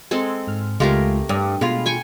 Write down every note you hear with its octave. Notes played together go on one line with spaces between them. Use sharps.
G#3 C4 A4
G#2 F6
C#2 G#3 A3 F4 G4 A#4
G2 D#6
B2 G#3 F4 G#4 B5
G5 G#5 C#6